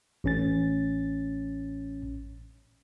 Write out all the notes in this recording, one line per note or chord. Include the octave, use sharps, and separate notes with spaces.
A1 C#4 A6